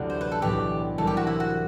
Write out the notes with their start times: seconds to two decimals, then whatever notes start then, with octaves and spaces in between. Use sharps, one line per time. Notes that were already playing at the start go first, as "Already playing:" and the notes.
Already playing: A1 D2 C3 F#3 B3 D4
0.10 C5
0.21 B4
0.31 A4
0.42 B1 A2 E3 B3 D4 G4
0.98 C2 C3 E3 A4
1.07 G4
1.17 F#4
1.27 E4
1.40 F#4